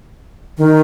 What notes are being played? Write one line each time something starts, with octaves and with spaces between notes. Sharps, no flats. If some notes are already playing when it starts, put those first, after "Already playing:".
D#3